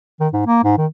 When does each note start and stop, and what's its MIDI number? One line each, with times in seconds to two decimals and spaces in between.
0.20 0.28 51
0.33 0.43 44
0.47 0.61 58
0.64 0.75 44
0.78 0.86 51